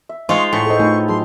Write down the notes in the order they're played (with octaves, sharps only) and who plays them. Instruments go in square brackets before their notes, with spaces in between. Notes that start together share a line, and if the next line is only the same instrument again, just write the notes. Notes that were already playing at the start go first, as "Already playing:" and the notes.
[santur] E5
[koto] G#3 F4 [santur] D#4 [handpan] C5 [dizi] C#6
[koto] A2 [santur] G#4 [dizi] C#6
[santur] D#4 G#4 [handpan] A4 C5
[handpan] A3 D#4 A#4 [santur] F4 B4 G#5
[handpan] F#3 G#4 [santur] A5 [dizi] C6